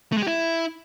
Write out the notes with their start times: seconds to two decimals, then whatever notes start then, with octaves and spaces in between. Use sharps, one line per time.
0.12 A3
0.17 G#3
0.22 G4
0.27 E4